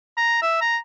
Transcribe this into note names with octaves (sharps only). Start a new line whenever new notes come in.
A#5
E5
A#5